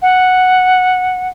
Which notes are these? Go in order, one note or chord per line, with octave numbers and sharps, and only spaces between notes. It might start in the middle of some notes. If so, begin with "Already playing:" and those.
F#5